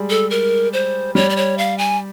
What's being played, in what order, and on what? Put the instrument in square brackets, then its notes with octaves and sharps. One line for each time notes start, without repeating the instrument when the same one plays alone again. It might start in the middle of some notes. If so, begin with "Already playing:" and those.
Already playing: [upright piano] G3 G#3
[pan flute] A4
A#4
C5
[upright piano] G3 [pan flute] C#5
[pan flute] D5
C#5
F5
G#5